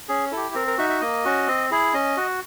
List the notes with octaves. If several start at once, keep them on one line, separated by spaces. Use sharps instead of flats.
C#4 G#4
E4 A4
G4
C4 A#4
A#4
D#4 F#4 E5
E5
A#3 D#5
C#4 F#4
C4
E4 G#4
C#4 D#5
F#4